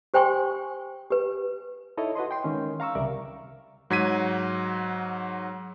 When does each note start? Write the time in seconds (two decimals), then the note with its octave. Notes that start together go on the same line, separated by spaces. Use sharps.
0.14 G4 C5 G5 G#5 C6 C#6
1.10 G4 B4
1.97 D#4 E4 A4 C#5 D#5
2.15 F#4 B4 D#5 C6
2.31 G5 C6
2.44 D#3 G#3 C#4
2.80 F5 A#5 C#6 E6
2.95 C2 C#3 G3 A#4 D5 E5
3.90 G#2 F#3 G#6 B6 D#7